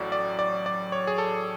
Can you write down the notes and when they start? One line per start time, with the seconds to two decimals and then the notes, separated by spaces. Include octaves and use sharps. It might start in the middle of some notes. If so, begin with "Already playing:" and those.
Already playing: A1 A2 F#3 D5
0.12 D5
0.39 D5
0.66 D5
0.92 C#5
1.07 G#4
1.18 A4